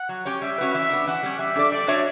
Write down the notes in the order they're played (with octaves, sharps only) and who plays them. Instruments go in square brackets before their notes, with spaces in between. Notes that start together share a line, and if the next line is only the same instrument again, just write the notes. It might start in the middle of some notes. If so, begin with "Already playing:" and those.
Already playing: [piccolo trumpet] F#5
[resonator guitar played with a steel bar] F#3
C#4 G4 C#5
[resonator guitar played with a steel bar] G3 [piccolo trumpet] E5
[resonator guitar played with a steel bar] C#4 F#4 B4
[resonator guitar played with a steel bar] E3 [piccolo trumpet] E5
[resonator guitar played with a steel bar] B3 D4
[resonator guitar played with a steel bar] E3 [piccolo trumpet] F#5
[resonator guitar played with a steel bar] G3 C#4
[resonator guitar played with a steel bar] G3 [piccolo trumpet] E5
[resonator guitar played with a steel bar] D4 A4 D5
[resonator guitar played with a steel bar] G3 [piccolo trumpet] D5
[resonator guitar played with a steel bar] D4 F#4 C#5 E5